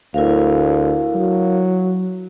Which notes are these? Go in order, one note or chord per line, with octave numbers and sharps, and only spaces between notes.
D2 E4 A#4 F5
F#3